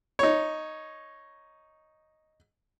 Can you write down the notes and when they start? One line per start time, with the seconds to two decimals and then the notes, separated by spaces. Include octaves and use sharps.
0.19 D#4 C#5